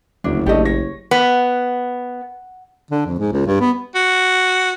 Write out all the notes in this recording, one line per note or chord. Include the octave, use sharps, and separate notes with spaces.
F#1 D2 D4
A1 A3 D4 G4 D5 D#5
C#5 A#6
B3
D3
F2
G#2
C#2
G2
B3
F#4